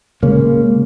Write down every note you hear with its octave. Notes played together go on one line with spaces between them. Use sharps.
C#3 G#3 A#3 C#4